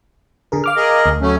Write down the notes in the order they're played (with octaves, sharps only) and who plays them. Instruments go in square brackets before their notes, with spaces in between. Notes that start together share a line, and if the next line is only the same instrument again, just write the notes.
[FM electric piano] D3 G#4 A#4
F5 D6 F6
[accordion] G#4 A#4 D#5
[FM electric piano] D2
[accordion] F#3 A3 C#4